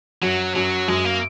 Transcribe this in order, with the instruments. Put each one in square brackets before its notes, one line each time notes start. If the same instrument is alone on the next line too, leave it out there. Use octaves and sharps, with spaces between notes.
[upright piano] F#2 [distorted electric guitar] F#3
[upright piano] F#2 [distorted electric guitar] F#3
[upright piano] F#2 [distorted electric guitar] G#3
[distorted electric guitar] A#3